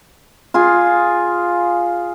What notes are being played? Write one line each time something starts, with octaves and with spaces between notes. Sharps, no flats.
F4 G#4 G#5